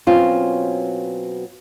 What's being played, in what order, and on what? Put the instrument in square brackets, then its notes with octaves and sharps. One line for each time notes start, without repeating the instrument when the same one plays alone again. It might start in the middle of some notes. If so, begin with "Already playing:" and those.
[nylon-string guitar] B2 F#3 C4 C#4 F4